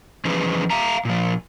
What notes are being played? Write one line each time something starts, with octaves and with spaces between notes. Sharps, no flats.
E3 F3 C#4 G#4 B4
E5 F5 A#5
A#2 F3